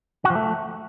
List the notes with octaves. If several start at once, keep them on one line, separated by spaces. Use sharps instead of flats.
F#4
F3
A3